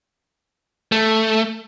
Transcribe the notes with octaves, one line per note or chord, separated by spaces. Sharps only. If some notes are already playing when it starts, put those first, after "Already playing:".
A3